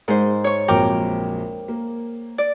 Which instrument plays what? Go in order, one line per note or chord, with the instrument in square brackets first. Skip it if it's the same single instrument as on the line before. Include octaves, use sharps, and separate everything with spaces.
[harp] G#2 C5 [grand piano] D#4 G#4 A#4
[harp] C#5 C#6
[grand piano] A#1 F2 F#3 [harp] A#4 G5 D6
[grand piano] A#3
[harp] D5